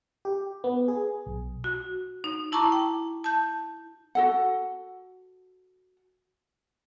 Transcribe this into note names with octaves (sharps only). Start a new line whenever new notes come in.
G4
B3
G#4
B1
F#4
D#4
E4 A5 A#5 C#6 D6
G5
A5 G6
F#4 A4 F#5